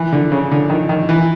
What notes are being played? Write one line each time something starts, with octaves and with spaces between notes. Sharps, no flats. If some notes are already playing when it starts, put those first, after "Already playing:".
Already playing: E3
D3
C#3
D3
D#3
D#3
E3